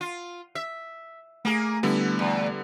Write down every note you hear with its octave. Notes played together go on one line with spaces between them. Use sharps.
F4
E5
A3 A#3 G#4
D3 G3 B3 E4
E2